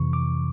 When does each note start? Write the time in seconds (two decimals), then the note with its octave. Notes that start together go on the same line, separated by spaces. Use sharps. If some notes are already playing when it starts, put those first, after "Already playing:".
Already playing: F2 C3 E3 C#6
0.13 D6